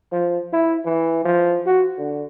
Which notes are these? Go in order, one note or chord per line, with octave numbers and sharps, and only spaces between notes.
F3
E4
E3
F3
F#4
D3